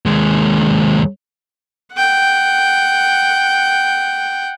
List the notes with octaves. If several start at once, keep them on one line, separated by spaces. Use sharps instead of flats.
D#2 G#3
F#5 G5